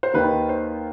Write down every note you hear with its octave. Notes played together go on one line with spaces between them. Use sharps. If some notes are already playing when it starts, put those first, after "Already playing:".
C5
D#2 D#3 B4
C5